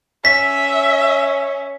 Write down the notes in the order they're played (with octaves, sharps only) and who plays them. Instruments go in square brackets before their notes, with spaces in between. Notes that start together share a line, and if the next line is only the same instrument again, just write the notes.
[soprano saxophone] C#4 [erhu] E5 [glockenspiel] B6